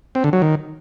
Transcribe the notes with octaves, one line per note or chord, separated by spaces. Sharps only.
C4
D3
F#3
D#3